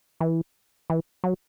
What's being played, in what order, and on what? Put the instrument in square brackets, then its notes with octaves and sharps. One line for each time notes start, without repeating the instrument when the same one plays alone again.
[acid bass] E3
E3
F#3